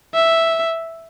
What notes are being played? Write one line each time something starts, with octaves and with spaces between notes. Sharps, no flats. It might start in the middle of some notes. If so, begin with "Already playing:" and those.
E5